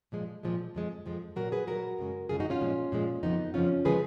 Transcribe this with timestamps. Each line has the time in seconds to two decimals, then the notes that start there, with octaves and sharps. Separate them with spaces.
0.12 A#2 F3 G#3
0.43 A#2 F3 G#3
0.75 F2 F3 G#3
1.06 F2 F3 G#3
1.36 A#2 F#3 F#4 A#4
1.52 G#4 B4
1.67 A#2 F#3 F#4 A#4
1.99 F#2 C#3 G#3
2.29 F#2 C#3 G#3 F4 G#4
2.40 D#4 F#4
2.50 C#4 F4
2.61 A#2 F3 G#3
2.92 A#2 F3 G#3
3.23 F2 C#3 F3 B3 D#4
3.54 F2 C#3 F3 C#4 F4
3.85 C#3 F3 G#3 G#4 B4